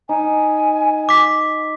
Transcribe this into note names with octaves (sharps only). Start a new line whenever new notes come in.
D#4 G#5
D6 B6